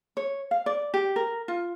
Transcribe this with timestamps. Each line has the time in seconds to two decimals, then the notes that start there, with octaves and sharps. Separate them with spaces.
0.17 C#5
0.51 F5
0.66 D5
0.94 G4
1.16 A#4
1.48 F4